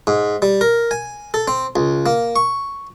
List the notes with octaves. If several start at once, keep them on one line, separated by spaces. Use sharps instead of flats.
G#2
G3
A#4
G#5
A4
C4
C#2
A#3
C#6